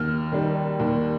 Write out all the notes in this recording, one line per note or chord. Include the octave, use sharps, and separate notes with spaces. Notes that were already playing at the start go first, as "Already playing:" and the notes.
Already playing: D#2 F6
D#3 G3
D#2